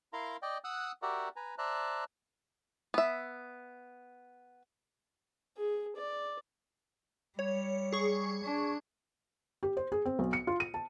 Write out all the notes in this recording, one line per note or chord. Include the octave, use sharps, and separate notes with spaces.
E4 A#4 F5 A#5 C6
D5 D#5 G5
F#5 D#6 E6 F#6
F#4 G4 A#4 D5 E5 F#5
B4 G#5 A#5
C5 D5 E5 A5 A#5 F#6
B3 E5
G#4
D5
G3 C#5
G#4 C#6
D4
G4
C5
G#4
C4
B1
C#7
F4
D#7
A5